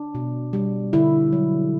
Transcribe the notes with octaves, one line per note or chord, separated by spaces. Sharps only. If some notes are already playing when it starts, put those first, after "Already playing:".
Already playing: D4
B2
G3
D3 E4
F#3